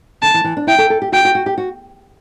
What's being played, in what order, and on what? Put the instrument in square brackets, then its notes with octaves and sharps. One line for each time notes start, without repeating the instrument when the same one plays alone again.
[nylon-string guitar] D3 [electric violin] A5
[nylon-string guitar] E3
E3
D4
[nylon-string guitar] E4 [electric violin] G5
[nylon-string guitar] A4
A4
G4
[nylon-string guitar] F#4 [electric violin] G5
[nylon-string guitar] F#4
F#4
G4
F#4